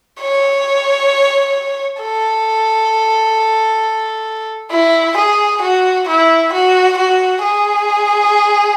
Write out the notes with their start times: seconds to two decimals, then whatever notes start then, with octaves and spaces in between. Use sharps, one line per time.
0.21 C#5
2.01 A4
4.71 E4
5.17 G#4
5.61 F#4
6.08 E4
6.53 F#4
6.98 F#4
7.43 G#4